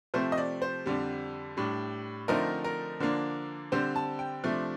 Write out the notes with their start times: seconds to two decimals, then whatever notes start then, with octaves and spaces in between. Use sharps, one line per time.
0.14 C3 F3 A3 C4 C5
0.32 D#5
0.38 D5
0.62 C5
0.86 F2 D3 G3
1.57 A2 G3 D4
2.28 D3 F3 A3 C4 D#4 A#4
2.64 A#4
3.00 D3 F3 A#3 D4
3.72 D3 G3 C4 C5
3.96 A5
4.19 G5
4.44 C3 F3 A3 D4